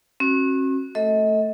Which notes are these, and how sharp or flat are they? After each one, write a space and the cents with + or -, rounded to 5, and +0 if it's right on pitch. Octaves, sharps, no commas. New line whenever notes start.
C#4 -45 F#4 +0
A3 +0 A4 +10 D#5 +40